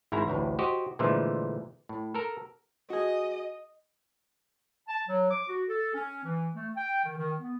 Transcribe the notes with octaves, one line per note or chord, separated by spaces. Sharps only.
G#1 G#2 E4 A#5
A1 D2 A2
F#4 G4 C5 D#5
A#2 D3 E3 F3 G#3 A3
A2
A4 A#4
F#4 G#4 D#5
A5
F#3
D6
F#4
A4
C#4
E3
A3
G5
D#3
D#3
B3